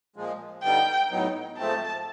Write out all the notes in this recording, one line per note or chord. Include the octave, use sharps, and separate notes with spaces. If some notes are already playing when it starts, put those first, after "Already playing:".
A#2 F3 G#3
D3 G3 B3 D#4 G5
A2 F#3 B3 D#4
G#2 F3 A3 C4 A5